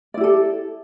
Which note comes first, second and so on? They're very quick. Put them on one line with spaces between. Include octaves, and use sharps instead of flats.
D5 E4 G4 A4